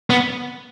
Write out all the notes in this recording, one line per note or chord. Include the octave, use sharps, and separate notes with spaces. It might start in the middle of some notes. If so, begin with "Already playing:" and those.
B3